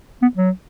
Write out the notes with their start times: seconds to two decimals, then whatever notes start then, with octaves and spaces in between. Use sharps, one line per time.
0.22 B3
0.37 F#3